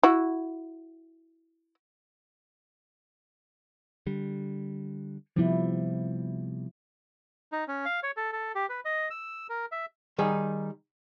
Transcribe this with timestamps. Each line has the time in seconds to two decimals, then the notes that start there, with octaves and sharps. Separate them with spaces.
0.03 E4 F#4
4.06 D3 G3
5.36 C3 F3 G3 B3 E4
7.52 D#4
7.68 C#4
7.85 F5
8.03 C#5
8.17 A4
8.33 A4
8.55 G4
8.69 B4
8.85 D#5
9.10 E6
9.49 A#4
9.72 E5
10.18 D#3 G3 D#4 G#4